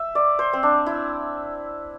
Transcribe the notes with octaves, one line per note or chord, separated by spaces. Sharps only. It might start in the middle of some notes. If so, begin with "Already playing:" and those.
Already playing: E5
D5
C5
C4
D4
E4